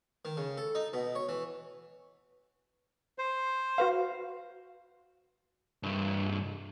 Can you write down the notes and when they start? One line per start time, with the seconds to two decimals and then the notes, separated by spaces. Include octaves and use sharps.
0.25 D#3
0.37 C#3
0.57 A4
0.75 D#4
0.93 B2
1.15 C#5
1.29 E3
3.18 C5
3.78 F#4 B4 F5
5.83 C2 G2